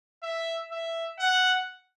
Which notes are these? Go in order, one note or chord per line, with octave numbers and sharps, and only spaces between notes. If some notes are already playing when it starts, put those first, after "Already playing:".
E5
E5
F#5